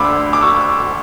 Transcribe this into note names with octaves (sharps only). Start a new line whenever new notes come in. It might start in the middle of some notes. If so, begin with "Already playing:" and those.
Already playing: D2 D3 B5 D6 E6
D6
C#6 E6